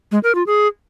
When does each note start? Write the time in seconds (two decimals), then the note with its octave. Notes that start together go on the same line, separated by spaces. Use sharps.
0.12 G#3
0.23 A#4
0.35 F4
0.47 G#4